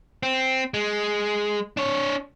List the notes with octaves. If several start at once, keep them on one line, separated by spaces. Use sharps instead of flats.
C4
G#3
D4 C#5